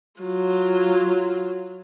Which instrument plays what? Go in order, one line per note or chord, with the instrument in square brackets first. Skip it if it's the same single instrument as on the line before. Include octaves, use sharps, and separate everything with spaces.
[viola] F#3 F4